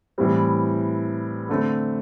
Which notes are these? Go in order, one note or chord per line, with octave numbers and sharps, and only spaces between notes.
A2 E3 G3 C4
D3 A3 C4